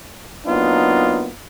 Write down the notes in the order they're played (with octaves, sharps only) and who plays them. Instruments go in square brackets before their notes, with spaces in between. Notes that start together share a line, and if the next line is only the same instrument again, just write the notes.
[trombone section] F#3 A#3 B3 D4 D#4 F4